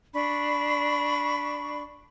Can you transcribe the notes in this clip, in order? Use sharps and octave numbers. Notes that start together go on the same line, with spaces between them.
D4 B5 C#6